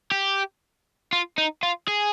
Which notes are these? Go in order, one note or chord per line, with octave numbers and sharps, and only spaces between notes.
G4
F4
D#4
F4
G#4